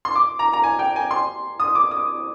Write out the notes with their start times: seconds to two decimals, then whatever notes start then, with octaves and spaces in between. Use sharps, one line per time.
0.05 C6
0.15 D6
0.39 A#5
0.53 A#5
0.63 G#5
0.79 G5
0.96 G#5
1.11 C6
1.60 D#6
1.75 D6
1.91 D#6